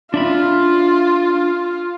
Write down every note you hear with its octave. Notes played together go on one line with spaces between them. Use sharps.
D4 F4 E5 B5